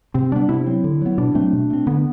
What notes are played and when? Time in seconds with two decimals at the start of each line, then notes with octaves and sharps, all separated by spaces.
0.14 C3 C4
0.32 G3 B3 D4
0.49 C3 E4
0.66 F#3 C4
0.84 D3
1.02 F#3 B3
1.18 B2 D4
1.35 F#3 A3 C4
1.53 B2
1.70 A3 C4
1.87 D3 B3